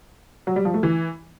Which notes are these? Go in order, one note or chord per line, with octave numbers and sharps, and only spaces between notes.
F#3
G3
F3
A3
E3